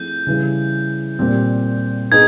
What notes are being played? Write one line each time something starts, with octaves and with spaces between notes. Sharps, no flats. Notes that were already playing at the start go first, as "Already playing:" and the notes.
Already playing: F3 A3 C4 E4 G#4 G6
C#3 E3 G3
A#2 G3 C4
B3 D#4 G#4 G#6